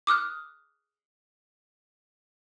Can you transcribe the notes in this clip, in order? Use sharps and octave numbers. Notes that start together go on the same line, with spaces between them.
D6 D#6 F6 F#6